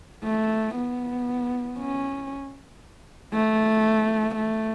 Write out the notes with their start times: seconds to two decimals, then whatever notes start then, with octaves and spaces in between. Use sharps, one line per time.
0.24 A3
0.76 B3
1.79 C#4
3.33 A3
4.35 A3